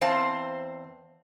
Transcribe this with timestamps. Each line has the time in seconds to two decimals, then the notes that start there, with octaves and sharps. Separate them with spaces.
0.01 E2 C4 C5 F5 A5